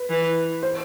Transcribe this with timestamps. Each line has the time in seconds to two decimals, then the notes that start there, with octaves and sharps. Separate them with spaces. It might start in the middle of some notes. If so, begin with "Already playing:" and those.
Already playing: B4
0.10 E3
0.63 C5